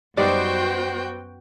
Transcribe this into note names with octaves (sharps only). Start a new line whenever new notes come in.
F#2 G3 B3 D#4 F#4 C5 D5 G5